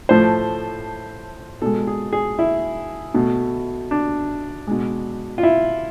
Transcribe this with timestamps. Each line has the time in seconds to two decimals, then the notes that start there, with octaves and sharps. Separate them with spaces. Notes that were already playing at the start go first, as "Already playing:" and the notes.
0.09 A2 F3 A3 C5
1.62 B2 G#3 A4
1.87 G#4
2.12 G#4
2.39 E4
3.14 B2 A3
3.91 D4
4.67 B2 G#3
5.38 F4
5.43 E4